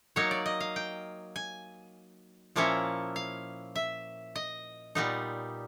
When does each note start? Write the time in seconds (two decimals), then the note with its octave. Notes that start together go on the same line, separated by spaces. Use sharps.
0.16 F#3 A#3 D#4 C#5
0.31 D5
0.46 D#5
0.60 F5
0.76 G5
1.36 G#5
2.56 A#2 F3 A#3 C#4 E4
3.16 F5
3.76 E5
4.35 D#5
4.95 A#2 G3 B3 D#4